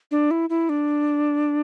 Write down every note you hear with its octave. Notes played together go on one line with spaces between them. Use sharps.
D4
E4
E4
D4